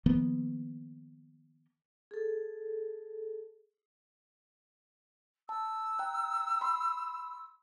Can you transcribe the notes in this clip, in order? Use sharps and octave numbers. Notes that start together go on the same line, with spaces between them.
D#3 F3 A#3 B3
G#4 A4
A5 E6
G5 A#5 F#6
B5 C6